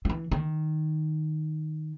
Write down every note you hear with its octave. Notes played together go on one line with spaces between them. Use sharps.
E3 F3
D#3